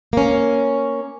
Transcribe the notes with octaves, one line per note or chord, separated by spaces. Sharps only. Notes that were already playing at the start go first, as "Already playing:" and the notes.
A#3 C#4